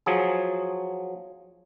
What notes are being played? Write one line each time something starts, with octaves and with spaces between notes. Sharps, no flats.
F3 F#3 G#4